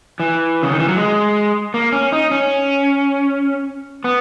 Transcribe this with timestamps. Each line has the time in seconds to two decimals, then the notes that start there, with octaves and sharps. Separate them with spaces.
0.20 E3
0.63 C#3
0.72 D#3
0.79 E3
0.88 F#3
0.96 G#3
1.74 A#3
1.92 C#4
2.12 D#4
2.31 C#4
4.04 B3